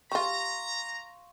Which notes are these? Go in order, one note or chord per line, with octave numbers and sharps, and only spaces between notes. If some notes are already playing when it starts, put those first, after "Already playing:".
G3 F4 F5 A#5 C6 C#6